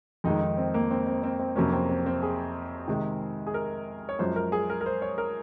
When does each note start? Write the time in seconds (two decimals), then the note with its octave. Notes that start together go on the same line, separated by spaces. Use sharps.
0.24 F2 D#3 G#3 D#4
0.41 D#4
0.58 C4
0.74 A#3
0.91 C4
1.07 C4
1.23 C4
1.39 C4
1.56 F2 C3 F#3 A#3 C#4
1.72 C4
1.89 C4
2.06 C4
2.22 G#4
2.88 C3 D#3 G#3
3.47 G#4
3.54 A#4
4.09 C#5
4.19 F#2 F3 G#3 C5
4.36 A#4
4.52 G#4
4.70 A#4
4.81 A#4
4.86 C5
5.02 C#5
5.18 A#4